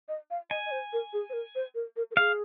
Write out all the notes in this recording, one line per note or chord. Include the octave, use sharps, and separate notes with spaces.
D#5
F5
D#5 G#5
D#5
C5
A#4
G#4
C5
A#4
C5
A#4
A#4
A#4
G#4 F5